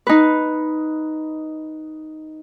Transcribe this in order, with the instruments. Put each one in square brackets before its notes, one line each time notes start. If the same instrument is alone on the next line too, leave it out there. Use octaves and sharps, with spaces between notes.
[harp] D#4 B4